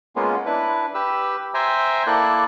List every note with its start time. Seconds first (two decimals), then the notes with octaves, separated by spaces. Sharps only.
0.16 G#3 A#3 B3 C#4 F4
0.46 D4 E4 B4
0.95 G4 B4 E6
1.54 C5 E5 G5 G#5 A#5
2.07 A#3 E4 A4 D5 F#6